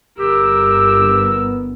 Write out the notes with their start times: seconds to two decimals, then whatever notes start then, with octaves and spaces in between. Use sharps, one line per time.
0.19 G1 G4 A#4 E6
1.06 B3